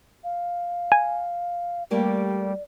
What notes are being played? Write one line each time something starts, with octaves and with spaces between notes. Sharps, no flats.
F5
G#5
G3 A3 A#3 G4 D5